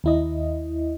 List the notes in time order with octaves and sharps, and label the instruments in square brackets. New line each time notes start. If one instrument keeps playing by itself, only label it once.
[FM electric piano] D#2 E4 D#5